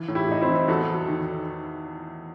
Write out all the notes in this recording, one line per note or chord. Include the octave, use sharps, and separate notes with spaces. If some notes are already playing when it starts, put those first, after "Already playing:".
Already playing: E3
A2
E4 G4
A2 D#4
C4 E4
E3
E2 F#4 A4
E2
D#3